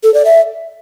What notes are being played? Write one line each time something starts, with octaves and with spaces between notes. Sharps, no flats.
A4
D5
E5